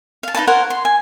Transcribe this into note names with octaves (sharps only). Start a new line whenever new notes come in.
F5 A5
D#4 E4 B4 A5
A#4 C5 C#5 F#5
C6
G#5